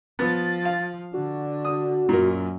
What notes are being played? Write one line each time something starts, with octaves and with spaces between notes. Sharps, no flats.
F3 B3 A6
F5
D3 D4 F#4
D#6
F#2 A#2 A#4